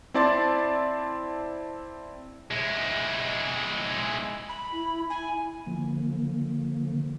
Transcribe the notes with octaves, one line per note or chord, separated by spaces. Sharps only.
C4 E4 D5 A5 C6 A6
G#3 E4
B5
E4
E4 G#5
D3 F3 A#3